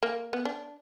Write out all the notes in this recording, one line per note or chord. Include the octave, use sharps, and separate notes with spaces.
A#3
B3
D4